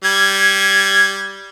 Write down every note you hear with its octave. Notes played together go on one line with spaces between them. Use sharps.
G3 G#6